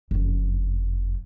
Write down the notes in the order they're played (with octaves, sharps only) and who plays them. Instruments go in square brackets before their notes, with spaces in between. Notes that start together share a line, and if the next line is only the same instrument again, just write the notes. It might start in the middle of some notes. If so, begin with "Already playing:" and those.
[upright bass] F#1 F2